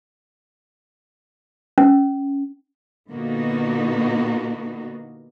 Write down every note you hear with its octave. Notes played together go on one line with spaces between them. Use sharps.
C#4
A#2 D3 A#3 B3 D#4 F#4